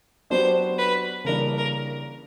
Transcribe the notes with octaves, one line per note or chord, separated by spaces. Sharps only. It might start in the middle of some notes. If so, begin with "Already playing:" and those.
F#3 B3 D4 G4 C5
B4
C#3 E3 G3 A#3 D4 A#4
A#4